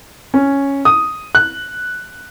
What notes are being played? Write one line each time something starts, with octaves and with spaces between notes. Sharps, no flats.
C#4
D#6
F#6